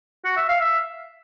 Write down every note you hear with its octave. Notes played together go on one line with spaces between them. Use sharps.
F#4
E5
F5
E5